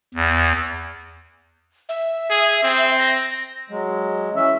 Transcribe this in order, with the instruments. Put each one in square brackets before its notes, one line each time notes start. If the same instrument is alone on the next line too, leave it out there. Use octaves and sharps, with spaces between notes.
[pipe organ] E2
[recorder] E5
[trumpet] G#4
C4
[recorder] A#6
[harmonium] F#3 G#3
[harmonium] E3 C#4 [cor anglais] E5